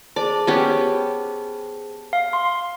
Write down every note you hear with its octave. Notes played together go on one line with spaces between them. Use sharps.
G#4 C5 D5 A5
B3 C#4 G4
F5
C6